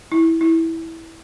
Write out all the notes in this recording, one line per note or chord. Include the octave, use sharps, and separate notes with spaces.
E4
E4